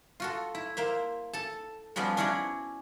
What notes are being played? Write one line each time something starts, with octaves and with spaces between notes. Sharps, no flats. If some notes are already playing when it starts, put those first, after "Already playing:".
F4 F#4 A4
E4
A#3 C5 E5
A4 A5
F3 G3 B3 C#4 F#4
C#4 D4 E4 F#4 C#5 D5